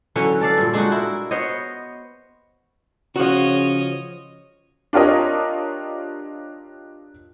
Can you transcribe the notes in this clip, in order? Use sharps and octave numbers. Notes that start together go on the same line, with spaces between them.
D3 E3 F#3 C#4
A4 D5 F5
G2 A#2
G#3 D4 D#4 F#4
E4 A#4
B3 C5 C#5 D#5
C#3 F3 F#4 C#5 D#5
D4 F4 G4 A#4 C#5 D#5